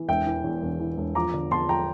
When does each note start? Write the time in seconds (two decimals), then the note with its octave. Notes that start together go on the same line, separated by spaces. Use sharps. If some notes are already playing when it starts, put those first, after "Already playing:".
Already playing: E3
0.08 E1 E5 G5
0.26 E3
0.44 E2
0.62 E1
0.80 E3
0.98 E1
1.15 F3 A#5 D6
1.34 D3
1.51 F3 A5 C6
1.69 F3 G5 A#5